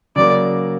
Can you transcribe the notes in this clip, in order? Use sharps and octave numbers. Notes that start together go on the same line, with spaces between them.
C#3 F#3 A#3 D5